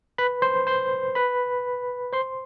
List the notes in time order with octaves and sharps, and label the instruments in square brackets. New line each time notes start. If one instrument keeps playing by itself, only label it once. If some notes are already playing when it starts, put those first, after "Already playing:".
[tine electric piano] B4 B5
C5 C6
C5 C6
B4 B5
C5 C6